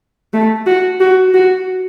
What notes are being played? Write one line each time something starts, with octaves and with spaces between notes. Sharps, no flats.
A3
F#4
F#4
F#4